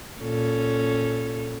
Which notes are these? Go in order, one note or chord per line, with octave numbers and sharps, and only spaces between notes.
A#2 C#4 A4